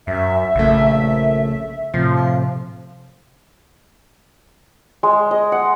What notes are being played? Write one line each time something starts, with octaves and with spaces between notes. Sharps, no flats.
F#2 E5
A#1 C#3 A3
A2 C3 F3
G#3
D#5
F#5